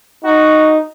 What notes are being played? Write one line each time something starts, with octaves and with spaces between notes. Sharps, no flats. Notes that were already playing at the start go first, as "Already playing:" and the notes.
D#4 F#4